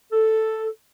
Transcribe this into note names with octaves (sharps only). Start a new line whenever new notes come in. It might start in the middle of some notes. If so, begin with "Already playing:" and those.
A4